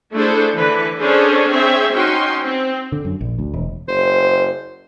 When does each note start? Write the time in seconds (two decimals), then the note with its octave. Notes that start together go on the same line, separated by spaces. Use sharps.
0.15 A3 D4 E4 G#4 A4 C5
0.57 D3 E3 B4
0.99 C#4 D4 G#4 A4 C5 C#5
1.49 C4 G#4 C5 C#5 E5
1.93 C#4 D#4 F#4 G5 C6
2.43 C4
2.92 D3
3.05 F#2
3.21 A#1
3.39 D2
3.54 E1
3.88 F#1 C5